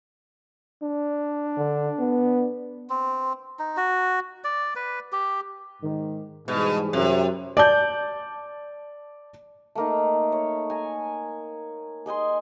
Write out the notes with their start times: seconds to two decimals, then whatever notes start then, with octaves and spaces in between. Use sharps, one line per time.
0.83 D4
1.57 D3
1.99 B3
2.90 C4
3.59 D#4
3.77 F#4
4.44 D5
4.76 B4
5.12 G4
5.83 G#2 D#3
6.48 G#2 B2 E3 G3 G#4
6.93 F#2 C3
7.57 D5 A5 G6
9.75 A3 A#3 D#4
10.32 C#5
10.70 G#5 A#5
12.06 G#4 D#5 G#5 C6